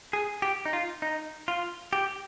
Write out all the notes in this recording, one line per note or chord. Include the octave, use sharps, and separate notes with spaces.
G#4
G4
D#4
F4
D#4
F4
G4